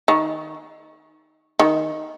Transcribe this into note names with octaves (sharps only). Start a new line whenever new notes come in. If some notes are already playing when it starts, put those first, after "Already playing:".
D#3
D#3